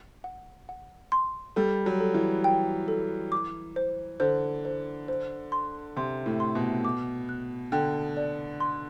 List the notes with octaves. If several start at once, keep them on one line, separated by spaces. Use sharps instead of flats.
F#5
F#5
C6
G3 A4
F#3
A4
E3
G5
A4
D6
C5
D3 C5
C5
C5
C6
C3 C6
A2
C6
B2
D6
F#6
D3 G5
D5
C6